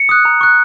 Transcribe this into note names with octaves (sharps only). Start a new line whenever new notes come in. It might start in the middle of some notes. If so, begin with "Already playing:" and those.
Already playing: C#7
D#6 F#6
A#5
C#6 F#6